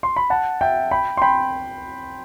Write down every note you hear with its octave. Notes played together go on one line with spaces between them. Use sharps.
C6
B5
F#5 A5
E5 G5
G5 B5
C6
G5 B5